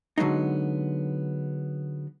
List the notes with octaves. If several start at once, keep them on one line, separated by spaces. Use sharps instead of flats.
D3 F#3 G#3 B3 D#4